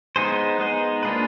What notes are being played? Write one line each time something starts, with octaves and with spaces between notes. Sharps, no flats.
G#3 B3 D#4 G#4 C5
G#3 B3 D#4 G#4 C5
A#3 D4 F4 G#4 B4